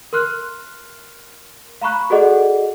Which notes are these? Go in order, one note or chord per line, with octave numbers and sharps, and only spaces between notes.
A#4 C6 F6 F#6
F5 A#5 B5 C#6 F#6
F#4 G#4 A4 D5 D#5 F#5